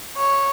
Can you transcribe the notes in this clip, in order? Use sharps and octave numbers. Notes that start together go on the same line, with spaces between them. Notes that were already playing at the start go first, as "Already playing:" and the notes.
C#5